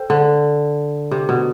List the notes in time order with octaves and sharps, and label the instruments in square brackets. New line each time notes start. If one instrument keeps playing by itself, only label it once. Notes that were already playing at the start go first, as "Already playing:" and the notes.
Already playing: [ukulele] A4 C5 G5
[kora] D3
C3
B2